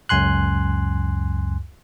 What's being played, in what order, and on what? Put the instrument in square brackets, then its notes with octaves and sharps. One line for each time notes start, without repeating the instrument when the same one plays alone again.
[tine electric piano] C#2 F#2 G#5 C6 F#6